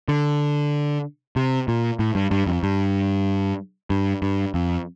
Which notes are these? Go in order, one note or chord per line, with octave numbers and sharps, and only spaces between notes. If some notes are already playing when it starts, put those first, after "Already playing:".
D3
C3
A#2
A2
G2
G2
F2
G2
G2
G2
F2